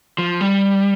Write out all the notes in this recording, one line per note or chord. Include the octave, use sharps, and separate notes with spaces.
F3
G3